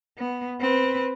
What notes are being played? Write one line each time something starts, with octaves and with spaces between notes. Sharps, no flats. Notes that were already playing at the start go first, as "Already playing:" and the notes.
B3
C4 B4